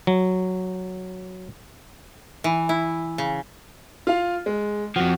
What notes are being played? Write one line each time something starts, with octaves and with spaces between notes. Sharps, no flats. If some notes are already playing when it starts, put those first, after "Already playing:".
F#3
E3
E4
C#3
F4 F5
G#3
F2 F3 F#4